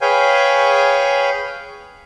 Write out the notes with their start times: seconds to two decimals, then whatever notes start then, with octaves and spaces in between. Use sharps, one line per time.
0.01 G#4 B4 C#5 F5 G5 G#5